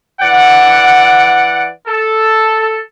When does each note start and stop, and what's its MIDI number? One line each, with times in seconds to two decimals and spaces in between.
0.21 1.69 52
0.21 1.69 74
0.21 1.69 78
1.87 2.79 69